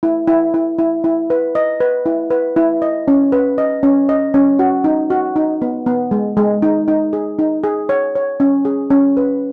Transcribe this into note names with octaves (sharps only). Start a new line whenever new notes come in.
E4
E4
E4
E4
E4
B4
D#5
B4
E4
B4
E4
D#5
C#4
B4
D#5
C#4
D#5
C#4
F#4
D#4
F#4
D#4
B3
B3
G#3
G#3
D#4
D#4
G#4
D#4
G#4
C#5
C#5
C#4
G#4
C#4
B4